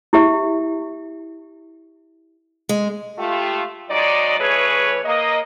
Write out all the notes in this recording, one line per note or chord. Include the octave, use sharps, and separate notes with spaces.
E4 G4 E5
G#3
A3 F4 G4
F#3 G#3 D#4 D5
E3 A3 G#4 B4 C#5
A#3 D#5